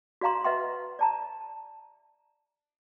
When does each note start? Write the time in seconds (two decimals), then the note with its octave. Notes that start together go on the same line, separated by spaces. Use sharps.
0.21 F#4 D5 F5 A#5 C6
0.44 B4 D#5 E5 F#5 A#5 C6
0.99 D5 A5 A#5